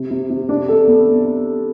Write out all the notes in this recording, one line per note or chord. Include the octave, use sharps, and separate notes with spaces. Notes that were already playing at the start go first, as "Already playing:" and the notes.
Already playing: C3
C3
C3
D4
A4
B3